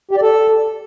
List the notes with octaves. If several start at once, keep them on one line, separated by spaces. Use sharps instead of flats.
G4
D5
A4